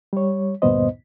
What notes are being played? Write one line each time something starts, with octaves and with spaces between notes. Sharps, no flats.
G3 C#5
D2 G2 A#2 B3 C5 D#5